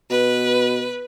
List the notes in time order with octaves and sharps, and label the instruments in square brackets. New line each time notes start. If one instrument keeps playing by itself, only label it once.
[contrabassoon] B2 [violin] B4